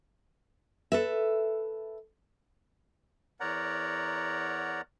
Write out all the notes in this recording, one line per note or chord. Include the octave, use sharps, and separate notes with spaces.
A4 B4 E5
E2 A#4 C#5 D5 F#5 A#5